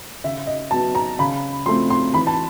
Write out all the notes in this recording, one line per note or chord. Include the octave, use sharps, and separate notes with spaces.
C#3 E5
D#5
F#3 B3 A5
A#5
C#3 B5
F3 A3 C4 C6
C6
E3 B5
A5